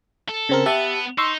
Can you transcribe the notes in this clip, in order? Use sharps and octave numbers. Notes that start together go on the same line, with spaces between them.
A4
C#3 C4 A#4
B3 G4 E5 A5
D#4 C6 C#6 E6